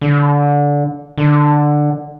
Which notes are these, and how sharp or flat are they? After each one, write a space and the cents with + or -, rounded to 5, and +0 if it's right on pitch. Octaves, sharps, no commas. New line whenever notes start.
D3 -20
D3 +10